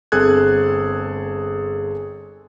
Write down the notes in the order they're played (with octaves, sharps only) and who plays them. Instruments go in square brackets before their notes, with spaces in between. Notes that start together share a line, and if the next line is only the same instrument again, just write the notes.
[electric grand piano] G1 C4 G#4 A4 F#6 G#6